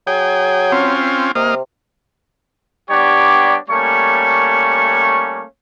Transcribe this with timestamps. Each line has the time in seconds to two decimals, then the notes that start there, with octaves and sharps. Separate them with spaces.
0.07 F#3 G#4 G5
0.72 C4 C#4 F4
1.35 C3 A#3 D#5 F5
2.90 G3 B3 D4 G4 C#5 D5
3.70 G3 A3 A#3 C#4 C#5 C#6